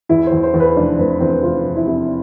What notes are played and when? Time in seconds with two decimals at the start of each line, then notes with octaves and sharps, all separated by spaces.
0.09 E2 E4
0.27 C5
0.32 E2
0.43 C5
0.54 E2
0.60 B4
0.76 F1 D4
0.98 F1 C4
1.20 E2 C4
1.43 F1 F4
1.65 F1
1.76 E4
1.87 C3